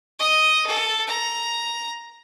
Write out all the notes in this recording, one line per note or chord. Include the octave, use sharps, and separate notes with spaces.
D#5 D#6
A4
A#5